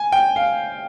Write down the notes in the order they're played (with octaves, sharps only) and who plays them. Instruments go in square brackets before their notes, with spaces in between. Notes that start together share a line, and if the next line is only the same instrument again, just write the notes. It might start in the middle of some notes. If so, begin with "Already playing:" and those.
Already playing: [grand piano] G#5
G5
F5